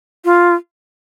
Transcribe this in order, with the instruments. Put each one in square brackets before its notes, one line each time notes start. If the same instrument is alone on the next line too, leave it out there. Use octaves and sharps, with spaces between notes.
[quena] F4